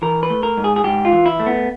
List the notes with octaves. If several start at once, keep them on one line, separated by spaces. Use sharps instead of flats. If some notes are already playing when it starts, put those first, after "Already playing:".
E3 A#4
B4
A3
A#4
G#2
G#4
G#4
G#2 G4
F4
E3
E4
A3
B3